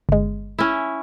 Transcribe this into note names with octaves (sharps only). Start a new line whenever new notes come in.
G1 G#3
C#4 E4